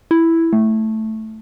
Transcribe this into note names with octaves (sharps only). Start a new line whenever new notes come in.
E4
A3